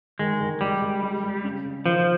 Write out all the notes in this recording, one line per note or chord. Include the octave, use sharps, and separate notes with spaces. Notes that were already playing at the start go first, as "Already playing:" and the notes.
D#3 G#3
D#3
G3 G#3
G#3
G#3
G#3
C#3
C#3
D#3 F3